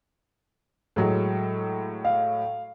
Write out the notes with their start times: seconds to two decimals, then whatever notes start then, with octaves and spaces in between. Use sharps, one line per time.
0.96 A2 F#3 G#3
2.05 F5